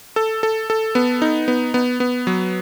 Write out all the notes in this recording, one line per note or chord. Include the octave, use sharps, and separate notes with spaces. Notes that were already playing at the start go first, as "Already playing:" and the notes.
A4
A4
A4
B3
D#4
B3
B3
B3
F#3